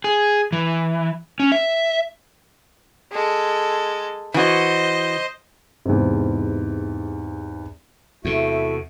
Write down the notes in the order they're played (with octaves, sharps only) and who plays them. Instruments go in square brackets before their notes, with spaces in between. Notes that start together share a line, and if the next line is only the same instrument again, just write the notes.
[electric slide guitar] G#4
E3
C#4
E5
[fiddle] G#3 A4
[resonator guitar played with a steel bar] E3 F#4 [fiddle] C5 D#5
[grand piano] E2 G#2 C3
[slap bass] E2 C3 [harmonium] A3 F#4 [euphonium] E4 [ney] E5